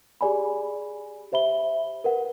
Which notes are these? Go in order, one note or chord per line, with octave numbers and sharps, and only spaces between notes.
G4 G#4 D5 G#5 B5
G4 C5 E5 B5 G7
A#4 B4 F#5